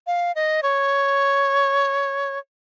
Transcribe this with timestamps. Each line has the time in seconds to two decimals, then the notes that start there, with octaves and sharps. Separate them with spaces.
0.07 F5
0.35 D#5
0.63 C#5